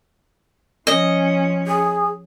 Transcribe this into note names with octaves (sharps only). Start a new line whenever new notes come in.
F3 C#4 D#5
G#4